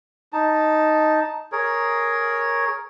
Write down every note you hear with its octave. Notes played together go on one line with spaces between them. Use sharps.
D#4 A5
G#4 A#4 C#5